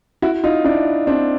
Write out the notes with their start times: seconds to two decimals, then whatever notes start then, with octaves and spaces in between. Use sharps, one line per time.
0.22 E4 F#4
0.44 D#4 F4
0.64 D4 E4
1.07 C4 D4